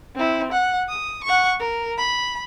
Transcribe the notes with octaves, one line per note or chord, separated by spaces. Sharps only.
C4 E4
F#5
D#6
F#5 C#6
A#4
B5